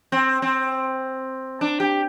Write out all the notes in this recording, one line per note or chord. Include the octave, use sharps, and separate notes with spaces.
C4
C4
D4
G4